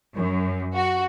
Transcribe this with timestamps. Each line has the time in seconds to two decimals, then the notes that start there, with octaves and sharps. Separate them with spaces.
0.16 F#2
0.75 F#4